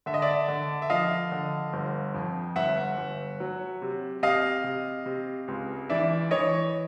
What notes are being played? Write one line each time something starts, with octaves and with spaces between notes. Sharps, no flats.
D3 E5
D#5
D5 E5
D3
E5
F3 D#5 F5
D3
G1
F2
G1 E5 F#5
G1
F#3
C3
C3 D#5 F5
C3
C3
C#2
E3 D5 E5
E3 C#5 D#5